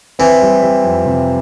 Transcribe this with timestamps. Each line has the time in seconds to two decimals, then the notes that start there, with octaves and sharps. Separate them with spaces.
0.19 E3 C4
0.42 G3
0.62 G3
0.84 F2
1.06 C3